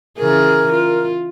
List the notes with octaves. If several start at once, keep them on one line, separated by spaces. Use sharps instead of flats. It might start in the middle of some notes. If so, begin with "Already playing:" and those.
C#3 E3 G#4 A#4
F4